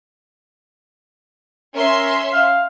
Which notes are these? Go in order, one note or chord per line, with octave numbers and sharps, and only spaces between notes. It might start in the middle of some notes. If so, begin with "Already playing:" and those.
C#4 A#4 E5 C6
F5